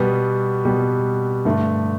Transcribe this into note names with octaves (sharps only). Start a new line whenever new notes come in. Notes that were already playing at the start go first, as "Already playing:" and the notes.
Already playing: B2 G3 B3
B2 G3 B3
G2 D3 A3